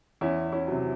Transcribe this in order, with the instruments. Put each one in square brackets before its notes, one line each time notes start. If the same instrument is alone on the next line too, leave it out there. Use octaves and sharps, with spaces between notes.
[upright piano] E2 C#4 E4
C#4 E4
C3 F#3